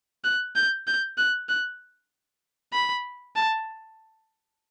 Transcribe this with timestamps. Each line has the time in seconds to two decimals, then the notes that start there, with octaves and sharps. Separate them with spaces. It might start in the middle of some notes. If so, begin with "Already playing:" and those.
0.24 F#6
0.56 G6
0.87 G6
1.18 F#6
1.49 F#6
2.73 B5
3.36 A5